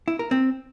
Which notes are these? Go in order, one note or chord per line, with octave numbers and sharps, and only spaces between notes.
E4
A#4
C4